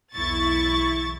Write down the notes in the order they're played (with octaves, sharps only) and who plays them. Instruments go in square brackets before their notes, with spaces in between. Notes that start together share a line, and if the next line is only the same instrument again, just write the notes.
[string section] B1 E2 E4 C#6 A6